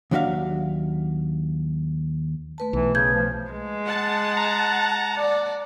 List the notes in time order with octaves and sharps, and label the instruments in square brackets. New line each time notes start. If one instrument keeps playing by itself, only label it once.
[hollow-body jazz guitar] D#2 F#3 D4 F#4 E5 F5
[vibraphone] A3 B4 A5
[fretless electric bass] B1 [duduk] E3
[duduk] C#3 [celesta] G6 G#6
[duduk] F3
[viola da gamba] G#3
[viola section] F#5 A5
[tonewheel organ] A#5
[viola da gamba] D5